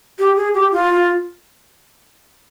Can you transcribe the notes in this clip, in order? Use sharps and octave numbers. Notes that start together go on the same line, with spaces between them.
G4
G#4
G4
F4